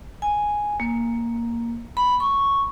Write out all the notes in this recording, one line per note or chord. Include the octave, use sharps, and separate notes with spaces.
G#5
A#3
B5
C#6